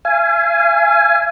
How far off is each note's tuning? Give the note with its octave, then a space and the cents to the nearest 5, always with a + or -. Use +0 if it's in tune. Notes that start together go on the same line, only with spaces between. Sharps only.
F5 -40 G#5 +0